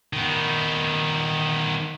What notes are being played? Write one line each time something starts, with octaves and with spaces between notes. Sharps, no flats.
D#3 B3